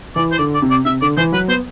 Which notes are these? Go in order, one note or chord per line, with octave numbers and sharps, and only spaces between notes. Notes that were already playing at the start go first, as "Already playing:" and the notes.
E3 D5
C5
D3 D5
D5
C3
D5
C3 E5
D3 D5
E3 C5
F#3 B4
B3 C5